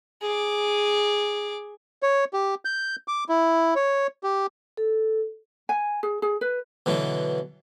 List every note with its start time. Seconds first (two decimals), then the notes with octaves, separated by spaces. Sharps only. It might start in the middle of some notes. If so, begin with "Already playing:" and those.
0.22 G#4 D6
2.03 C#5
2.33 G4
2.65 G6
3.08 D6
3.29 E4
3.76 C#5
4.23 G4
4.77 A4
5.69 G#5
6.03 G#4
6.22 G#4
6.41 B4
6.86 B2 D3 E3 F#3